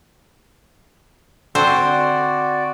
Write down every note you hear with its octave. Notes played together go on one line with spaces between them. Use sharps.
D3 C4 F#4 C5 D5